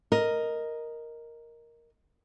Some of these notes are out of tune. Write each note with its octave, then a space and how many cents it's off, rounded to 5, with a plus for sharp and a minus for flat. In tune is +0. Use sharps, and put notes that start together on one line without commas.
A#4 +0 D#5 +0